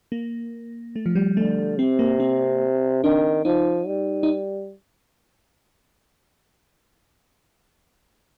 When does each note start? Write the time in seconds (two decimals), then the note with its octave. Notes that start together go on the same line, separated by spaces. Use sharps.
0.12 A#3
0.96 A3
1.06 F3
1.15 G3
1.37 D3 A3
1.79 C3 C4
1.99 A#3
2.20 C4
3.04 D#3 D4
3.45 F3 D#4
3.87 G3
4.23 D#4